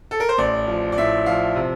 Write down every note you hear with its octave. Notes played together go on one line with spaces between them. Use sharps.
A4
A#4
C5
A1 D5
F3
D5
A2 E5
F3 F5
C3